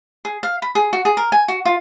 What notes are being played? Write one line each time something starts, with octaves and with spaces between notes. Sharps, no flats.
G#4
F5
B5
G#4
F#4
G#4
A#4
G#5
F#4
F4